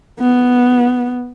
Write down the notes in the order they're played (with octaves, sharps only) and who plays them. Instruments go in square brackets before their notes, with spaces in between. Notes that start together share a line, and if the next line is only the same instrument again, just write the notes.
[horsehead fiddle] B3